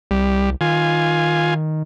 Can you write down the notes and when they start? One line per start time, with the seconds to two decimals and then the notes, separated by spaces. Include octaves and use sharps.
0.11 C2 G3
0.61 D#3 F4 G#5